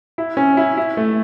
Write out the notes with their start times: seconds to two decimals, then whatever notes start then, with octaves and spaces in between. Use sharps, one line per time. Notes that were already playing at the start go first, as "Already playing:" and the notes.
0.18 E4
0.37 C#4
0.57 E4
0.77 E4
0.97 A3